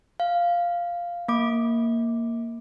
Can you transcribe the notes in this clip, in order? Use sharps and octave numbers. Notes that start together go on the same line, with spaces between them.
F5
A#3 D6